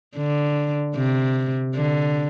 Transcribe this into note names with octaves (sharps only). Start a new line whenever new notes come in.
D3
C3
D3